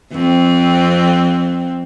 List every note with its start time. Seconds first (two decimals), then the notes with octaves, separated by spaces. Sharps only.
0.11 F2 C4